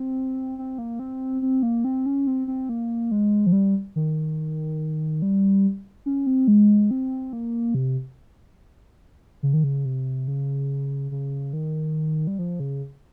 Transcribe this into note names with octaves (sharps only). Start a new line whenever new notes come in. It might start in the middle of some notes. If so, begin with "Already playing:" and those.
Already playing: C4
C4
A#3
C4
C4
A#3
C4
C#4
C4
C4
A#3
G#3
F3
G3
D#3
G3
C#4
C4
G#3
C4
A#3
C3
C#3
D#3
C#3
C3
C#3
C#3
D#3
G3
F3
C#3